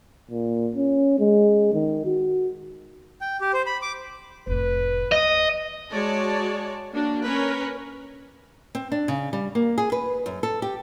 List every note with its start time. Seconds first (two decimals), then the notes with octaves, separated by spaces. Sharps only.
0.31 A#2
0.75 C#4
1.19 G#3
1.73 D#3
2.06 F#4
3.21 G5
3.41 G4
3.53 C5
3.67 B5
3.82 D6
4.47 F1 A2 B4
5.12 D#2 D#5
5.91 G#3 F#4 C#5 D5 A5
6.91 A#3 D4 F#4
7.22 C#4 A#4 B4
8.75 C4
8.92 D4
9.08 C#3
9.33 G3
9.55 A#3
9.78 G#4
9.92 B4
10.26 F#2
10.43 A4
10.62 G4